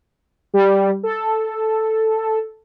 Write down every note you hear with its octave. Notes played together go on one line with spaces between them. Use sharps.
G3
A4